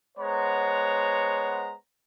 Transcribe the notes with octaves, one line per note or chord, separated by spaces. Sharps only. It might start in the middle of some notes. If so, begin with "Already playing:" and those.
G#3 B3 C5 C#5 F#5 A#5